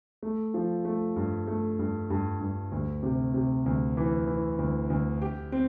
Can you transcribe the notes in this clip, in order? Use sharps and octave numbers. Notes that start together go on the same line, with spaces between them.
A3
F3
A3
G2
A3
G2
G2
G2
D2
C3
C3
D2
E3
E3
D2
D2
G4
C4